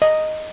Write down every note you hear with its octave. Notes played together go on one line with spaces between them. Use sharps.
D#5